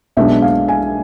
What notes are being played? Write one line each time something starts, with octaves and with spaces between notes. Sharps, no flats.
B1 B2 G#3 B3 D4 E5
F5
G#5